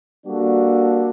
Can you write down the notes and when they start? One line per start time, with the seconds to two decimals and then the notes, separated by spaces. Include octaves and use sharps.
0.25 G3 A#3 D4 F#4 A4